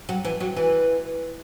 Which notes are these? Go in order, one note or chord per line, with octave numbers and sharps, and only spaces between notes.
F#3
E3
F#3
E3